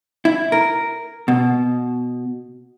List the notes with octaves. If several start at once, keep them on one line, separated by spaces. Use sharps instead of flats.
E4
A#4
B2